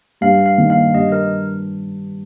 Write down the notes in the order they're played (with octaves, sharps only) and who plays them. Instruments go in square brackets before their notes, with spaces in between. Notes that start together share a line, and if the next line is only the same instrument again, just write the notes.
[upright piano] G2 [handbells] F5
[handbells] F5
[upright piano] D#3 A#3 D#4
[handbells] F5
[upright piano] G2 [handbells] D#5
[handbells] A#4